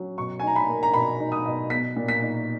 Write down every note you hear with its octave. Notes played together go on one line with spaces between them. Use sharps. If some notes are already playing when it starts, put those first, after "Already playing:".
Already playing: F#3 C#4
B2 C#6
G#5
D#4 A#5
B5
A#3
A#5
B2 B5
D#4
D#6
B2
B3 B6
A#2
B6
D#4